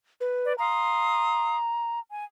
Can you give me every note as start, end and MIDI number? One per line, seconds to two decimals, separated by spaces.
0.21 0.55 71
0.43 0.53 74
0.58 1.57 77
0.58 1.99 82
0.58 1.57 84
0.58 1.57 87
2.10 2.24 80